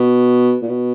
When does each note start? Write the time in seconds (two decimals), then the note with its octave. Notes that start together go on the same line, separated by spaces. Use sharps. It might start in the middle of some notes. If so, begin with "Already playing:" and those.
Already playing: B2
0.62 A#2
0.69 B2